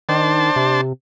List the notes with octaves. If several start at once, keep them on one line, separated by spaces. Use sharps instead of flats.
D#3 D4 C5 A5
C3